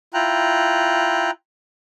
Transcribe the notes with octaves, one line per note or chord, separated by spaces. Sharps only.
E4 F4 G5 A#5 F#6